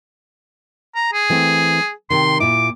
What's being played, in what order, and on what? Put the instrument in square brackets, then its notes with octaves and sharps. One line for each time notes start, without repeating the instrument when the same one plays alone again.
[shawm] A#5
G#4
[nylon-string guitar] E3 A3 C4
[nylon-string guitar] C3 D#3 [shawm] C6
[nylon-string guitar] A#2 E4 [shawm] D6